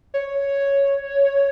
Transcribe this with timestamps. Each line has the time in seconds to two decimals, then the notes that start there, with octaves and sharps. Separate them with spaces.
0.14 C#5